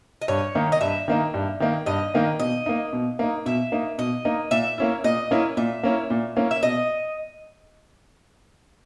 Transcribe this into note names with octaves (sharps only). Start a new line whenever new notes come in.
D#5
G2 C#5
D#3 A#3 D#4
D#5
G2 E5
D#3 A#3 D#4
G2
D#3 A#3 D#4
G2 D#5
D#3 A#3 D#4
B2 D#5
A#3 D#4
B2
A#3 D#4
B2 E5
A#3 D#4
B2 D#5
A#3 D#4
A#2 E5
A#3 C#4 E4
A#2 D#5
A#3 C#4 E4
A#2 E5
A#3 C#4 E4
A#2
A#3 C#4 E4
E5
B2 D#5